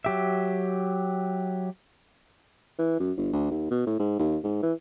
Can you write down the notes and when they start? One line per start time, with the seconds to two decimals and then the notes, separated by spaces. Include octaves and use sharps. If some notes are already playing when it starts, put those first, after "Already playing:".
0.05 F#3 G4 E5
2.79 E3
2.99 F#2
3.17 G1
3.33 D2
3.51 D#2
3.71 B2
3.87 A2
3.99 G#2
4.19 D#2
4.44 G#2
4.63 E3